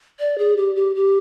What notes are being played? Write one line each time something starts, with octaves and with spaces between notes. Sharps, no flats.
D5
G#4
G4
G4
G4